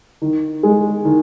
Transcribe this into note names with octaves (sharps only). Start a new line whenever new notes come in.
D#3
G#3
D#3